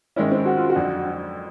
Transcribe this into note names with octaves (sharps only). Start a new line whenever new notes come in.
G#2 D#3 G#3 C#4 E4
C4
F#4
F4
F#4
F2 D3 F#3